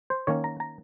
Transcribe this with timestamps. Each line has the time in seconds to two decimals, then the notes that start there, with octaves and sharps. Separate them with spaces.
0.10 C5
0.27 D#3 A#3 C#4 C#5
0.44 A#5
0.60 A#5